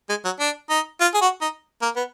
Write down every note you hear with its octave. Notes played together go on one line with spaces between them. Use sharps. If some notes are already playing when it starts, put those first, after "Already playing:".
G#3
F#3
D4
D#4
F4
G#4
F#4
D#4
A#3
B3